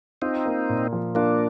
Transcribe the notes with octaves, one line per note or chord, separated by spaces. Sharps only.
C4 D#4 F4
A#3
A#2
F3
A#3 D4 F4